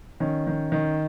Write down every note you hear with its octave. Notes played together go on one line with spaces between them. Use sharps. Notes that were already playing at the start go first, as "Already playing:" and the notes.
D#3 C#4
D#3
D#3